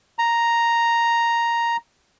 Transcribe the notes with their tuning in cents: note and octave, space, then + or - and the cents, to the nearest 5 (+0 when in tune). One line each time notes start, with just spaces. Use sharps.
A#5 +0